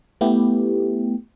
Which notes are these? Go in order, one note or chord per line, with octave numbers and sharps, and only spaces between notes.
A3 B3 E4 G4